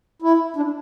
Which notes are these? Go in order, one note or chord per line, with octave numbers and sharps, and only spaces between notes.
E4
D4